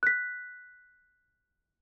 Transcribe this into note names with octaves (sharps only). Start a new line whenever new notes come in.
F#6 B6